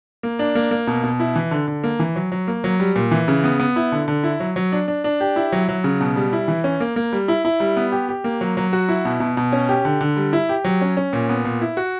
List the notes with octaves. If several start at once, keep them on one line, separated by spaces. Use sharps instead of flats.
A#3
D4
A#3
A#3
B2
B2
E4
E3
D3
D3
A#3
E3
F#3
F#3
A#3
F#3
G3
A#2
E3
C#3
B3
B3
E4
D3
D3
E4
F#3
F#3
D4
D4
D4
G4
E4
F#3
F#3
C#3
B2
G3
E4
E3
C#4
A#3
A#3
G3
E4
E4
G3
B3
G4
G4
A#3
F#3
F#3
F#4
E4
B2
B2
B2
C#4
G4
D3
D3
G3
E4
G4
F#3
C#4
C#4
A#2
B3
A#2
E4
F#4